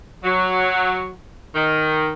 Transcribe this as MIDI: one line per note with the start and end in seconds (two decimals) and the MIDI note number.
0.24 1.10 54
1.55 2.13 51